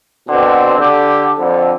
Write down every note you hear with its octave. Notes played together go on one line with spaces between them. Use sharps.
B2 D3 C4
D3 G4
F2 D3